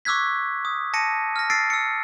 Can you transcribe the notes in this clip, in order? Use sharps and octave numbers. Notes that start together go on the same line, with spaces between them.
C#6 D6 E6 F#6 G#6 B6
D#6
A5 A#6 C#7 D#7
F6 A#6
E6 A6 C7 D7
E6 C#7